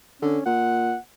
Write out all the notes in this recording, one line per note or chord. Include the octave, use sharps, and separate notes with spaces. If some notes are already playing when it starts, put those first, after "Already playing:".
D3 C#4
A#2 F#5